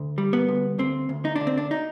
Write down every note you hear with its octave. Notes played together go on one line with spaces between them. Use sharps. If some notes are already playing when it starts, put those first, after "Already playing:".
Already playing: D2
G3
B3
D2
D2 C4
D2
D#4
D2 D4
C4
D4
D#4